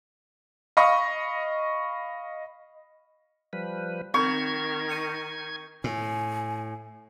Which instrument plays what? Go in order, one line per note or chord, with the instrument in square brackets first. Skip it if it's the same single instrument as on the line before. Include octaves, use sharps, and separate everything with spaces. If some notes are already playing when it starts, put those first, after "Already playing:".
[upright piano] D#5 F5 B5 C#6 D#6
[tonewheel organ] F3 G3 B4
[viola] D#3 [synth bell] C4 G6 [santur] C#6 [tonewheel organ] G#6
[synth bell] G6 C#7 D#7
[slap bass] A2 [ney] G#5